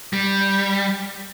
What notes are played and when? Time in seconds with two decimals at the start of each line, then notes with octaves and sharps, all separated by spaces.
0.13 G3